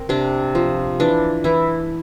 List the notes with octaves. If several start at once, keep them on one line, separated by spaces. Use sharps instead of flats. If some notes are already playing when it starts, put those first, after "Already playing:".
Already playing: C4 A#4
C3 D4
F3
E3 D4
E3 E4